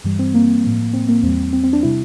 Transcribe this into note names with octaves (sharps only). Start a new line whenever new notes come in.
G2 E3 G3
C4
A#3
A2 F3
C4
A#3
E2 E3 G3 C4
C4
C4
D4
C3 G3 E4